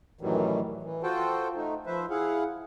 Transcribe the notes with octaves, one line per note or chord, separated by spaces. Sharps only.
F#2 A2 D#3 E3 F#3 G3
E3
F4 F#4 A4 C5 G5 A5
A3 D#4
F3 B4 C5 E5
E4 G#4 F5 F#5